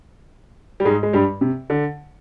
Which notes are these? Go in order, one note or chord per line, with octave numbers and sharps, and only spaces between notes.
G3
G#2 G#3
G#3
G2 G3
C3
D3